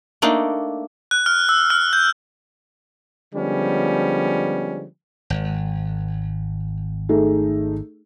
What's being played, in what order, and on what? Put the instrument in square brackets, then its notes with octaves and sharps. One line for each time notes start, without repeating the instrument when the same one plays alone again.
[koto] A3 A#3 D4 D#4
[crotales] F#6
F6
E6
F6
G6
[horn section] D3 F3 G3 G#3 B3 C#4
[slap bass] G#1
[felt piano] A3 D#4 G#4